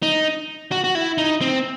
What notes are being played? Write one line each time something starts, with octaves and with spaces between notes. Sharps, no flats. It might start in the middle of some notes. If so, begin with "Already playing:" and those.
D#4
F#4
F#4
E4
D#4
C4